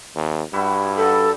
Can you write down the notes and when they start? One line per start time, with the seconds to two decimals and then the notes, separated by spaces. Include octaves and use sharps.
0.15 D#2
0.53 G2 G3 E4 F#4
0.97 D3 D#4 A4 B5